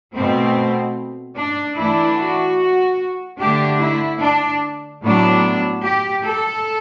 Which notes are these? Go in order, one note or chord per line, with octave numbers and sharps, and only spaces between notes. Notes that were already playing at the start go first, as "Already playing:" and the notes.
B2 A3 C4
D4
E3 A3 D4 E4
F#4
D3 A3 D4 G4
E4
D4
A2 F#3 B3 D4
G4
A4